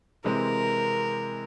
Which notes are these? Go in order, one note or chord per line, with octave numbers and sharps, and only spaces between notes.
C3 E3 G#3 C4 A#4